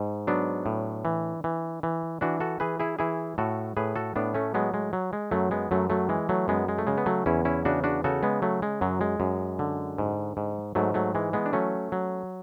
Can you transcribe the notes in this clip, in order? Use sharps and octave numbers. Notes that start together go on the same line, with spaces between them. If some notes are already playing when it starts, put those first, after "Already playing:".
Already playing: G#2
F#3 B3 D4
A2
E3
E3
E3
E3 D4 F#4
F#4 A4
E3 G#4 B4
E4 G#4
E3 E4 G#4
A2 F#4 A4
A2 G#4 B4
F#4 A4
A2 B3 D4
A3 C#4
F#3 G#3 B3
G#3
F#3
G#3
F#2 F#3 A3
G#3 B3
F#2 F#3 A3
F#3 A3
E3 G#3
F#3 A3
F#2 G#3 B3
G#3
A3
C#3 G#3
B3
F#3 A3
E2 C#4 E4
C#4 E4
C#3 D4 F#4
D4 F#4
C#3 F#4 A4
G#3 B3
F#3 A3
G#3
F#2 F#3
G#3
F#2
D3
G#2
G#2
G#2 F#3 A3
F#3 A3
E3 G#3
G#3 B3
D4
F#3 A3 C#4
F#3